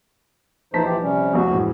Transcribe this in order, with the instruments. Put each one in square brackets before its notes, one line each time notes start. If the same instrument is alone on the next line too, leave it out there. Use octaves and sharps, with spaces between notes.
[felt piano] A#1 A5 B6 [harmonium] E3 D#4 C5
[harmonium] E3 G4
C3 G3 C#4
[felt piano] F1 C2 [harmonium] F#4
[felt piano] E1 A2